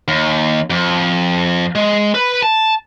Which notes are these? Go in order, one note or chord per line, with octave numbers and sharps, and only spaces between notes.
D#2
F2
G#3
B4
A5